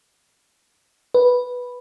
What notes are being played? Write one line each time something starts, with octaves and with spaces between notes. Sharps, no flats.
B4